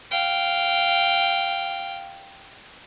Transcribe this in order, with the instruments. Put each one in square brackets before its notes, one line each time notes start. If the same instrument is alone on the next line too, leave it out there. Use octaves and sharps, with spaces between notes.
[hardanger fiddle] F5 G5